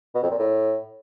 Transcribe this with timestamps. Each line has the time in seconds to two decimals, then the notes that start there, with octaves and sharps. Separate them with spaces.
0.15 B2
0.23 F2
0.31 A#2
0.39 A2